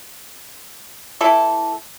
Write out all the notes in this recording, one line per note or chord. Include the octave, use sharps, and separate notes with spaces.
E3 E4 A4